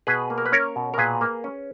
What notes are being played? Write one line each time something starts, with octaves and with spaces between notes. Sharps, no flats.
B2 G#4 B4
A#3
A#4
B4
C#4 A#4 C#5
B2
A#4
A#2 G#4 B4
A#3
C#4